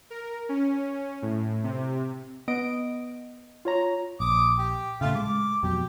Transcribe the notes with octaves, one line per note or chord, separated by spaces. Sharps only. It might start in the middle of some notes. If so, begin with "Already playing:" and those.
A#4
C#4
A2
C3
B3 D#5 D#6 D7
F4 C#5 A#5
A#1 D6 D#6
G4
A2 C#3 A3 F4 F5
G#3 D6
F2 B2 F#3 G4